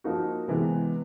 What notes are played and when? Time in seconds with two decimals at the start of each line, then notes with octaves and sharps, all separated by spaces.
0.04 F3 A#3 D#4 F#4
0.48 C3 E3 G#3 B3